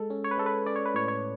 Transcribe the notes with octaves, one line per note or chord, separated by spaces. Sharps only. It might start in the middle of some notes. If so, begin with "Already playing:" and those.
Already playing: G#3 A4
C#4
C#5
B4
G#3 A4
B4
C#4 D5
C#5
B4
A2 C#5
C#5